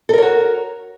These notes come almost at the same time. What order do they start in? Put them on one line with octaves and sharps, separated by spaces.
A4 A#4 C#5 F#4